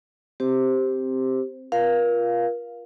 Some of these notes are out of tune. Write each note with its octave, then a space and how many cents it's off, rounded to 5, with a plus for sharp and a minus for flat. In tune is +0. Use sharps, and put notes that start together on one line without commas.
C4 +0 G4 +0 C5 +0
F4 +0 A#4 +35 F5 +0